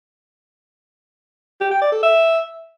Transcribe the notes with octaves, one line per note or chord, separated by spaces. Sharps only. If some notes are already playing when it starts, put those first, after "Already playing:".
G4
G5
D5
A4
E5